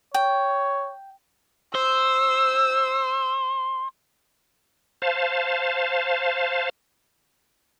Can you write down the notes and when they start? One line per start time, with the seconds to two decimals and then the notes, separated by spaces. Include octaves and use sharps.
0.14 C#5 G5
1.75 C5 E6
5.02 C5 F5 A5